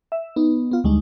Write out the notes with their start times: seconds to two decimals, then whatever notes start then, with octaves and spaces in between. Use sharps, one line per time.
0.12 E5
0.36 B3 D#4
0.71 B3 F4
0.84 D2 G3 G#3 D#4